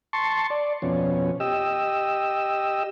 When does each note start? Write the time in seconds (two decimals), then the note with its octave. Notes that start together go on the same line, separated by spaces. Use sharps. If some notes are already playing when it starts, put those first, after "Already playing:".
0.13 A5 C6 C#6
0.50 D5
0.82 F2 B2 C#4
1.40 G4 D#5 E6